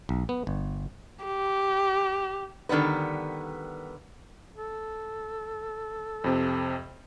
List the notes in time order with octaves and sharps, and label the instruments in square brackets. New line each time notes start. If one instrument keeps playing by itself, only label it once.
[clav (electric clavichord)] B1
B3
G1
[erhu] G4
[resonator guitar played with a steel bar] D3 D#3 G3 B3 B4
[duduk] A4
[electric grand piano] F2 C3 C4